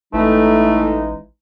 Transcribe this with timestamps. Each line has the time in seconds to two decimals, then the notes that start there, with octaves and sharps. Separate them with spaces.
0.14 A1 A2 E3 G#3 A3 D#4